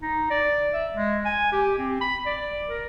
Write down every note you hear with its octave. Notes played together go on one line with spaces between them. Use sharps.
D#4
D5
E5
G#3
G#5
G4
C4
B5
D5
A#4